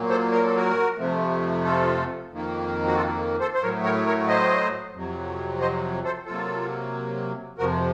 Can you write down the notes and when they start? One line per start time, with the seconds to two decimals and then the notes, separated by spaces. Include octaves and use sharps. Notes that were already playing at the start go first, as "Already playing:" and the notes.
Already playing: A#2 F#3 A#3
0.09 A4 C5
0.32 A#4
0.43 A4
0.56 F#4 A#4
0.97 F2 C3 F3 A3
1.65 F4 A4
2.31 F2 D#3 A#3
2.87 F#4
2.95 F4 A4
3.40 A4 C5
3.54 C5
3.62 A2 F#3 A3 A#4 C#5
3.84 A#4 C#5
4.07 A#4 C#5
4.28 C5 D#5
4.94 F2 C3 F#3
5.61 C5 D#5
6.04 A4 C5
6.26 C3 F#3 A#3 F4 A4
7.58 F2 C3 F3 F#4 A#4